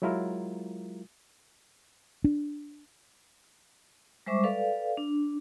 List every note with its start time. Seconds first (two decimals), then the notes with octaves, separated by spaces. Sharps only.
0.02 F#3 G#3 E4 F4 A#4
2.24 D4
4.26 G3 G#3 C5 E5 C#6 D6
4.44 A4 B4 D5 F5
4.97 D4